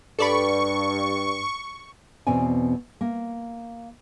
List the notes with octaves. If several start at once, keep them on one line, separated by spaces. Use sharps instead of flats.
G2 A4 D5 B5 C#6
E2 B2 C4 D5 G#5
A#3